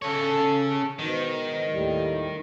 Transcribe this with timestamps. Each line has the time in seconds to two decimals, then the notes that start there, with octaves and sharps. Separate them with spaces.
0.02 C#3 A4 C#5
0.99 G#2 B2 D#3
1.71 D#2 A2 G3